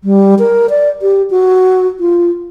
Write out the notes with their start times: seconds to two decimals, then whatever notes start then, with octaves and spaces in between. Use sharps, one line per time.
0.04 G3
0.39 A#4
0.70 D5
1.02 G4
1.30 F#4
2.00 F4